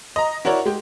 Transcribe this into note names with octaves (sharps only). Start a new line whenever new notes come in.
D#5 A#5
E4 F#4 A#4 C#5 D5
G#3 G4